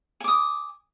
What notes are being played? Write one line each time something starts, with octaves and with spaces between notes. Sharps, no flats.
G#5 D6 D#6